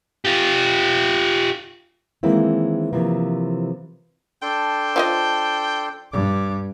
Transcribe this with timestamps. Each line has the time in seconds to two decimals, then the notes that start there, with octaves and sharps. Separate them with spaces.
0.25 F4 G4
2.23 D#3 E3 G#3 A#3 C4 E4
2.93 C3 E3 F3 A#3
4.42 D4 A4 G5 C6
4.96 F3 F4 D#5
6.12 G2 D6